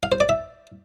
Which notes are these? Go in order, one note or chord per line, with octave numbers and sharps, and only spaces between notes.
F5
C5
D5
E5